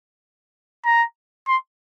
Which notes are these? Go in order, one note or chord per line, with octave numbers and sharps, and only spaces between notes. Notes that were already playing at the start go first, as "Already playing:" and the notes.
A#5
C6